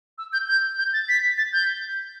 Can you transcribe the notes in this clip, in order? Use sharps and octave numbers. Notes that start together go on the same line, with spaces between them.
E6
G6
G6
G6
A6
B6
A6
G6